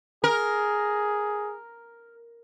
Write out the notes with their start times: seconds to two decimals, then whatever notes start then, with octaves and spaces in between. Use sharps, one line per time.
0.24 G#4 A#4